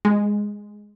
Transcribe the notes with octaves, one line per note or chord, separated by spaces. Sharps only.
G#3